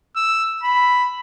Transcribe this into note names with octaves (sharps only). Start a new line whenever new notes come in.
E6
B5